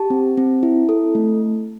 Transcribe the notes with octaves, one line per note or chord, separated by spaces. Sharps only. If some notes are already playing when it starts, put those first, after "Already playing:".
Already playing: G4 A5
C4
C4
E4
A4
A3